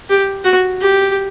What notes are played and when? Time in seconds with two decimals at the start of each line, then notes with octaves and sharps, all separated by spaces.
0.09 G4
0.44 F#4
0.81 G4